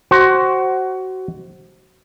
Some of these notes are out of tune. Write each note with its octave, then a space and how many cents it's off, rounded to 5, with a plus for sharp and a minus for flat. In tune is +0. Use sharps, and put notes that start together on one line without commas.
F#4 +20 C5 +15